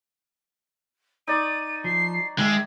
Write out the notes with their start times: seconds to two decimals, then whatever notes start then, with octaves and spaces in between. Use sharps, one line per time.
1.28 D#4 D5 C#6 D#7
1.84 F3 C7
2.38 D#3 G#3 E5 G5 G#6